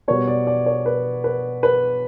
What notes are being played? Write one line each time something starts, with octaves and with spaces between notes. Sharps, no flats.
B2 G3 B3 C#5
D5
D5
C#5
B4
B4
B4